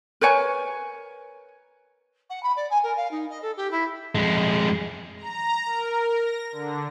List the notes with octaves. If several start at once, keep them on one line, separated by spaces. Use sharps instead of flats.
A#4 B4 C#5 G#5
F#5
B5
D5
G#5
A#4
F5
D#4
D#5
A4
G4
E4
F2 G#3
A#5
A#4
A#6
D3